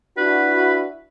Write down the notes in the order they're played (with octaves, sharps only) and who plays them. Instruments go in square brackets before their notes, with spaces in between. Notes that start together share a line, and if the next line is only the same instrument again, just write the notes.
[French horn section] D4 E4 F#4 [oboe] B4